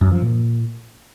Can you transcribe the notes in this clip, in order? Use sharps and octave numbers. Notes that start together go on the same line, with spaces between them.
F#2
F3
A#2